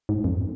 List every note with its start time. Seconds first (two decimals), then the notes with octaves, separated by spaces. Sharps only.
0.09 G#2
0.24 F2